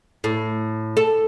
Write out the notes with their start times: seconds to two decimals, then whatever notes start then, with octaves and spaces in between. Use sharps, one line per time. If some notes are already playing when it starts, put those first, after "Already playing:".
0.24 A2
0.97 A4